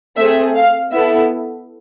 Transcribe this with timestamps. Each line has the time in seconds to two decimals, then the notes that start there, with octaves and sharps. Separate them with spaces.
0.16 A3 C4 G#4 E5
0.55 F5
0.91 B3 E4 A4 E5